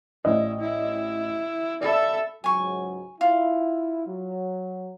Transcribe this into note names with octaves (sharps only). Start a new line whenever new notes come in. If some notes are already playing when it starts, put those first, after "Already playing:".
A1 E4 D5 D#5
E4
A4 D5 E5 B5
C#2 G#2 F#3 G#5 C#6
E4 F4
F#3